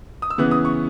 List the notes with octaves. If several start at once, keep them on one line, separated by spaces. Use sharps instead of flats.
D#6
E6
C#3 E3 B3 F#6
D#6
C#6